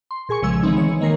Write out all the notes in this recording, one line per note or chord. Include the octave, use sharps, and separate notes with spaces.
C6
A#2 G#4 G#5 C#6 C#7
B1 C#3 F3 G#3 E6 G#6
D#3 E3 G#3 B3 C4 D#4
C#5
D#3 G#3 A#3 A#4 C#5 C7